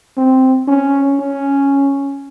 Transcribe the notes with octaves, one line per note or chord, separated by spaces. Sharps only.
C4
C#4
C#4